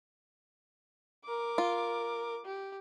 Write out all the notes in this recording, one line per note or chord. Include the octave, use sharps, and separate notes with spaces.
A#4 D6
F4
G4